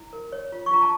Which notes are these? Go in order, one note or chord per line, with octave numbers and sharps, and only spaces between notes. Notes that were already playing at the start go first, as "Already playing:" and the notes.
Already playing: E4
A#4
C#5
F4
C#6
F4 A#5
A5